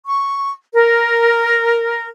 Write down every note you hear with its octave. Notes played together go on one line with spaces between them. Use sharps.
C#6
A#4